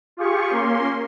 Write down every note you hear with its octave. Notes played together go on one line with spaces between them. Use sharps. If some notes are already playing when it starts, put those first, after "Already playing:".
F4 G4 G#4 C#6
A#3 C#4 C6